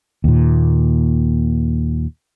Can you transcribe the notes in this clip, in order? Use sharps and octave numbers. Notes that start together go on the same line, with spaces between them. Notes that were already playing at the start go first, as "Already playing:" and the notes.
D#2 A#2